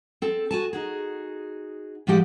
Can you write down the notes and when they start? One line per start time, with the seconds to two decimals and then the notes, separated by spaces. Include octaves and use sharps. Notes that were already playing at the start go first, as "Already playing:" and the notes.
0.22 C4 A4
0.51 F#4 G#5 A5
0.73 D#4 F#4 G#4
2.07 A2 F3 G#3 G4 F#5